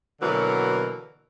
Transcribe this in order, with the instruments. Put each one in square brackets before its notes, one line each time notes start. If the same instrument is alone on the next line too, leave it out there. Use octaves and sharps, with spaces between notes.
[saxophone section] B2 D3 E3 F#3 A#3 F#4